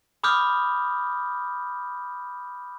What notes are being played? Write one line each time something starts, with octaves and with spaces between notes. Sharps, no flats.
B5 D6 D#6 F6 G6